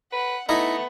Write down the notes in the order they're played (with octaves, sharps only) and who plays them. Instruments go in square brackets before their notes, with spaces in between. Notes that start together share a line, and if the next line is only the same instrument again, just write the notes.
[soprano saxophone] B4 [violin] F#5
[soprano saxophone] A3 [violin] B3 [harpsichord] D#4 E4 D#5